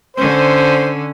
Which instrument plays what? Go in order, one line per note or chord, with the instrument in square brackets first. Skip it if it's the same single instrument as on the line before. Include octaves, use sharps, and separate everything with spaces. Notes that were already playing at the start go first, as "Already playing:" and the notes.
[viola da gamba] D3 C#4 [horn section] C5